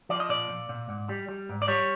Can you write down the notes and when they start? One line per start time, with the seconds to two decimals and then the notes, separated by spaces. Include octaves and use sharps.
0.09 F3 D5
0.20 D#5
0.29 A#2 D5
0.49 A#2
0.69 A#2
0.89 G#2
1.09 G3
1.29 G3
1.49 G#2
1.62 D5
1.68 G3 C#5